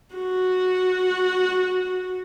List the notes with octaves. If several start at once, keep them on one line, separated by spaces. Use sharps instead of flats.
F#4